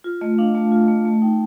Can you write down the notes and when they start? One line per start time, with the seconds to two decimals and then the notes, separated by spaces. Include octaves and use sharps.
0.04 F4
0.21 A3 D#5
0.38 D4 F5
0.55 A3 A5
0.72 F4
0.88 A3
1.05 A3 A5
1.22 D#4 G5